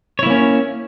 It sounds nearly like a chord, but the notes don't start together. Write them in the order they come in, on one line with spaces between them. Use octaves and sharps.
C#5 E4 A#3 C#4